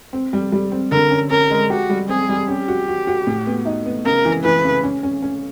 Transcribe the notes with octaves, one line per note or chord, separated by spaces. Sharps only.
C4
G3
G3
C4
D3 A#4
C#4
C#4 A#4
G#3
F#4 G4
G3
C4 G#4
G3
C#4 G4
F#4
F#4
F#4
A2
B3
D#4
B3
C#3 A#4
E3
E3 B4
C#3
C#4
C#4
C#4